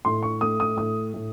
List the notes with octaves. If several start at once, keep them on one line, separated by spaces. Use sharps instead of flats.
A2 C6
C#6
A3 D#6
D#6
A2 D#6
A2